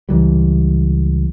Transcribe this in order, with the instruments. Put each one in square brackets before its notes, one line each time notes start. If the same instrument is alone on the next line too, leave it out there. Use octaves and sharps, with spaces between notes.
[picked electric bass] C#2 E3 G3